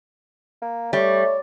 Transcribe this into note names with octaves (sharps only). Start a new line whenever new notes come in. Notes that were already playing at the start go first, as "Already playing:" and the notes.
A#3
G3 A3 C#5